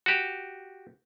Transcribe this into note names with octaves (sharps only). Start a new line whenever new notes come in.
F#4 G4